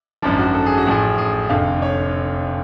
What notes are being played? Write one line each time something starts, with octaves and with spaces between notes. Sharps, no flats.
G#1 F#2 F3 D4
F#4
A4
G#4
F#4
A1 A2 F3 G#4
G#4
F1 F2 D3 F5
C#5